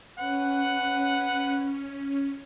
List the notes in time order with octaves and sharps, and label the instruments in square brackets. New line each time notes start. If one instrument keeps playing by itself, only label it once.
[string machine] C#4 [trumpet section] B4 F#5